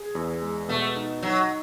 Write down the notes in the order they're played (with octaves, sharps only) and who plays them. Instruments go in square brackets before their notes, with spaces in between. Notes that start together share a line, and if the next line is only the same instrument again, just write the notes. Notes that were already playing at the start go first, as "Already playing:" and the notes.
Already playing: [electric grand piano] G#4
E2
G#3
[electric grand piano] B2 [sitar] A3
[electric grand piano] D#4
[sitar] F#3 [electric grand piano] D#4